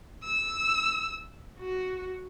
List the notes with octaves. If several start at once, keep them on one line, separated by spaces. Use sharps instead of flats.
E6
F#4